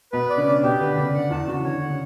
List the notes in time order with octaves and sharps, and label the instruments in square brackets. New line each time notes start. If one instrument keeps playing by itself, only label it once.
[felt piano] B2 B3 [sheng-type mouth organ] B4
[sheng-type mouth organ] D5
[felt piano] C#3 C#4
[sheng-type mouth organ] D4
[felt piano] B2 B3 [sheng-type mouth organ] G4
[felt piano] D3 [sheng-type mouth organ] B4
[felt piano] C#3 [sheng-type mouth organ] D5
[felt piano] D3 [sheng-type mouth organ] F#5
[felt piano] E2 E3 [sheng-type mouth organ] A5
[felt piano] C#3 [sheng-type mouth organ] F#4
[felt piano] E3
[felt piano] D3 [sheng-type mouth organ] C#5
[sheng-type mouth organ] F#5
[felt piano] C#3